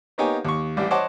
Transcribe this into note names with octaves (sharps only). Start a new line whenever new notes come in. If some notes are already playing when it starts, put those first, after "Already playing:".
A#3 B3 D#4 G4 C#5 G#5
D#2 C#6
A1 G3 D5
C5 C#5 D#5 F#5 A5 D6